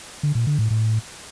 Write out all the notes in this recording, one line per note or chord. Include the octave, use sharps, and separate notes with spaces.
D3
A#2
D3
A2
A2